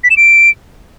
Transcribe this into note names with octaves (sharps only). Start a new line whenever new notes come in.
B6
E7
D7